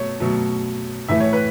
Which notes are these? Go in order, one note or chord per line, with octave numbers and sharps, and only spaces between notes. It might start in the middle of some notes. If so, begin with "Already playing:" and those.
Already playing: B2 F#3 A3 C#5
B2 F#3 A3
A2 E3 A3 E5
C#5
B4